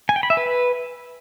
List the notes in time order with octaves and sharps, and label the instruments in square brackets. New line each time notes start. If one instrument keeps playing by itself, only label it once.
[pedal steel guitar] G#5
G5
B5
E5
B4